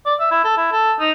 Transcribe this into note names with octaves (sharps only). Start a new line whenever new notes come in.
D5
E5
E4
A4
E4
A4
D#4